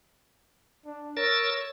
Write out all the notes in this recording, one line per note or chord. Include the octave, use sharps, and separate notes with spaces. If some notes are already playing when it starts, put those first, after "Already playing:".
D4
A#4 C#5 E6 A6